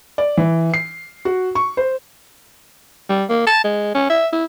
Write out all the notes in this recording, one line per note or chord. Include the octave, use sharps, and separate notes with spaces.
D5
E3
C7
F#4
C#6
C5
G3
A#3
A5
G#3
C#4
E5
E4